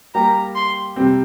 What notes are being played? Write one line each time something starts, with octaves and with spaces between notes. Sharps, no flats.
G3 A#3 G4 A#5
C6
C3 G3 C4